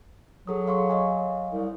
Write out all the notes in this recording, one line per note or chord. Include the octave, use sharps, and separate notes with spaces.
F#3 G#4 A4 D#6
F5 C6 C#6
D#5 F5 G#5
C2